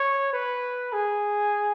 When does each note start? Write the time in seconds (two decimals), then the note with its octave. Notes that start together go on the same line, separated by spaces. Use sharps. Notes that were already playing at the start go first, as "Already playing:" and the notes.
Already playing: C#5
0.33 B4
0.93 G#4